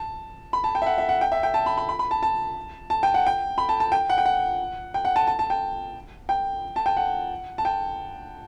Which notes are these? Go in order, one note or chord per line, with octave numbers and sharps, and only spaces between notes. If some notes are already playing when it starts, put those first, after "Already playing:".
Already playing: A5
B5
A5
G5
E5
F#5
E5
F#5
G5
E5
G5
A5
B5
B5
B5
B5
A5
A5
A5
G5
F#5
G5
B5
A5
A5
G5
F#5
G5
F#5
G5
F#5
A5
A5
A5
G5
G5
A5
G5
F#5
A5
G5